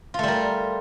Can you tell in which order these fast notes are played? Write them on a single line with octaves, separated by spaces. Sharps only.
F4 A3 G3 A#4